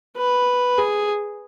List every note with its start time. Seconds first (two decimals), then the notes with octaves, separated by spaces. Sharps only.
0.17 B4
0.78 G#4